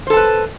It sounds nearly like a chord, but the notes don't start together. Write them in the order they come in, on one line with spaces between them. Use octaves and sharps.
C5 A4 A5 B4